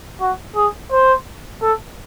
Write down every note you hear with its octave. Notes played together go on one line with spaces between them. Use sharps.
F#4
G#4
C5
A4